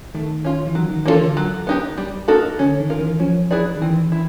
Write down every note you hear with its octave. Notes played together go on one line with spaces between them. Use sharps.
D#3 A3
C#4 F4
E3
D#3 F#3
D#3
E3 A#3 D4 F4 A4
D3
F#3
B3 D#4 G4
G3
A#3 D#4 F#4 A4
D3 C#4
D#3
F4 A#4
E3
F3 C#4
E4 G#4 B4 D5
D#3
E3 C4
E4